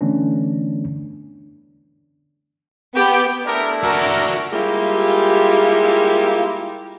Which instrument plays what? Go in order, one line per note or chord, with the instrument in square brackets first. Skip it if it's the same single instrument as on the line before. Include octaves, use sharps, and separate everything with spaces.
[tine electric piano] D3 E3 A3 B3 C#4 D4
[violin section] B3 [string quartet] G4
[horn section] A3 D4 E4 [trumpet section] B3 A#4
[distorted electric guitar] F#4 A4 [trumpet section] A#4
[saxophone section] G3 G#3 A#3 E4 F4 G4